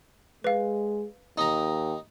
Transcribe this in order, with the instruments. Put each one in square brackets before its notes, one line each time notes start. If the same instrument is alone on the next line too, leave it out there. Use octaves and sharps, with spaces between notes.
[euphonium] G#3 [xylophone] B4 F5
[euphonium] D#2 [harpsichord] D#4 A#5